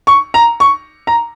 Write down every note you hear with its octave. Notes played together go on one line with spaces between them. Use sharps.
C#6
A#5
C#6
A#5